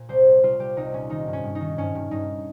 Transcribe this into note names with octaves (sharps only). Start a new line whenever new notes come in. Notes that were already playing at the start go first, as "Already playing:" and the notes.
Already playing: A#2
C2 C5
A#2
C2 F4
C2 G4
C2 D#4
A#2 C#4
D#3 D#4
G2
C#4
G2
D#4
D#3
G2 C#4
G2
G2 D#4